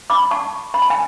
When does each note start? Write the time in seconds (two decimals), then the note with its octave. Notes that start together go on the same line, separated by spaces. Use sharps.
0.10 B5 D6
0.31 A5 C#6
0.74 B5
0.82 A5
0.90 G#5